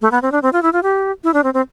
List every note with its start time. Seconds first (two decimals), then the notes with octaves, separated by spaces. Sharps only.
0.02 A3
0.12 B3
0.22 C4
0.32 D4
0.42 C4
0.53 F4
0.62 E4
0.73 F4
0.83 G4
1.24 E4
1.34 D4
1.44 C4
1.54 C4